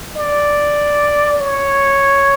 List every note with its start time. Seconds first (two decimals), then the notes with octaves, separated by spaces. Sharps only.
0.16 D5
1.40 C#5